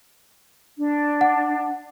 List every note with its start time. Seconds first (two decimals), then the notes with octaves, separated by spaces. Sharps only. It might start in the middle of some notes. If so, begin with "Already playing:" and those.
0.78 D4
1.21 F#5